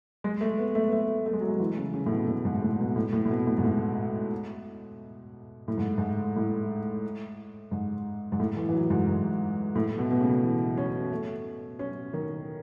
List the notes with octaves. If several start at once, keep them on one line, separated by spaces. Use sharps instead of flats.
G#3
A3
B3
A3
B3
A3
A3
G#3
F#3
G#3
E3
C#3
C#3
A2
B2
A2
G#2
A2
B2
A2
A2
A2
B2
A2
G#2
A2
A2
G#2
G#2
A2
G#2
G#2
A2
E3
E3
F#3
G#2
G#2
A2
B2
B2
C#3
E3
C#4
A3
C#4
D#3